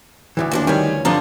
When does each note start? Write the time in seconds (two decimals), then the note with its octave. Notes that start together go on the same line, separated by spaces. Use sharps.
0.37 D2 G#2 E3
0.51 D#2 F3 D4
0.67 D#3 G3 C#5 G#5
1.05 G2 D3 F3 D4 A#5